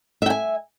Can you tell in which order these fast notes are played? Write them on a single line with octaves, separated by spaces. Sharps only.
E5 G5 G#5